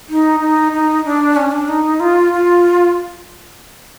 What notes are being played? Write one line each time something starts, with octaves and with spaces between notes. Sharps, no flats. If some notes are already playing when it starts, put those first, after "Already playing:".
D#4
D#4
D#4
D4
C#4
D4
D#4
F4
F4